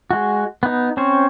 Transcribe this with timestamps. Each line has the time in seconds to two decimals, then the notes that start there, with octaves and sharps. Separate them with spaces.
0.11 G#3 F#4
0.63 B3 D#4
0.97 C4 C#4 C5 C#5